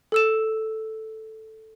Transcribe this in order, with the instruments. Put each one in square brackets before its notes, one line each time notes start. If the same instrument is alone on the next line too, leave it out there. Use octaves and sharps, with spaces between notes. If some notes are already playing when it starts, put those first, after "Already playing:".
[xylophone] A4 E6 E7